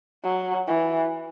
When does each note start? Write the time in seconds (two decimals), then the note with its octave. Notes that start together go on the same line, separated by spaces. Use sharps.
0.24 F#3
0.67 E3